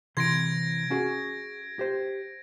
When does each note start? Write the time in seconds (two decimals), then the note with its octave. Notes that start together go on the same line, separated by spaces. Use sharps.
0.17 C3 E3 C6 G#6 A#6 D7
0.90 C#4 F#4 G#4
1.79 G4 C5